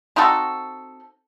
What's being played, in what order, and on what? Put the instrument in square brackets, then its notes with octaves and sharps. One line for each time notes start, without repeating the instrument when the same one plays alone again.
[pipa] C4 D#4 F#4 A4